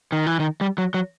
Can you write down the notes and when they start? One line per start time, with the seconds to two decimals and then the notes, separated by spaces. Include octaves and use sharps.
0.12 D#3
0.27 E3
0.39 D#3
0.61 G3
0.78 F#3
0.94 F#3